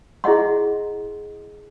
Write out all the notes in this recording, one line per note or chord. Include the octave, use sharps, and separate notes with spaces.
E4 G#4 D#5 F#5 C6